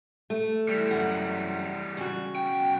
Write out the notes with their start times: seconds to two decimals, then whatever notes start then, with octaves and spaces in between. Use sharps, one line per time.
0.30 A3
0.69 E3 G3
0.91 F#2 F#5
1.97 C#3 F#4
2.36 B1 G5